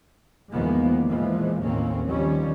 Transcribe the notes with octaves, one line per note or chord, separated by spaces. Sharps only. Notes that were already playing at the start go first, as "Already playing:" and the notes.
E2 D#3 F3 G#3 A#3 B3
A#2 E3 F3 G#3
A1 D#2 A2 A#3 C4 C#4
D#3 F3 G3 C#4